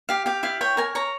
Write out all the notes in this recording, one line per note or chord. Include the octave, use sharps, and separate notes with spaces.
G4 F5
G4 F5
E4 F5
C#5 G5
A#4 G#5
C#5 A#5